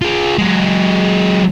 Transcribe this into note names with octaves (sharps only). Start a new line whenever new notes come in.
F4 G#4
F#3 G#3